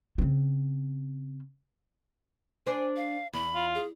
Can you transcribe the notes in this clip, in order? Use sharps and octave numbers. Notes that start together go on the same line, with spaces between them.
C#3 C4
D4 C5 G#5
F5
E2 B5
F4
G#4